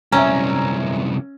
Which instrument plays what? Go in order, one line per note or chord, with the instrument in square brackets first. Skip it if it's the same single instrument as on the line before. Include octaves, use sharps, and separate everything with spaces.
[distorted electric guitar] C2 F#2 [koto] C#4 [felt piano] E5 G#5 A#5